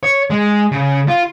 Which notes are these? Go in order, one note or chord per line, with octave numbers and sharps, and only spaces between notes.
C#5
G#3
C#3
F4